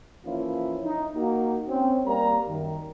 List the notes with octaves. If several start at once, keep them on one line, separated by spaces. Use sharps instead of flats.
E3 F3 A#3 C#4 E4 F4
D#4
A#3 D#4 F#4
C4 C#4
G3 A#3 A#5
F#2 D#3